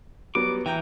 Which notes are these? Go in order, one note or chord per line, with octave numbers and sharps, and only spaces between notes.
F#3 G3 B3 D6
E3 G5 A#5 G6